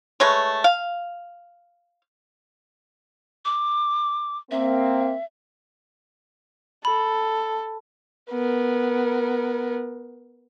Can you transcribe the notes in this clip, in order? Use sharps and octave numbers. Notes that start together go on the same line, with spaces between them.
G#3 A3 B4 C#5
F5
D6
A#3 C4 E5
A4 B5
B3 A#4